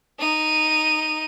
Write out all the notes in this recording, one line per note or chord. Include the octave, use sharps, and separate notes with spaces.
D#4 D#7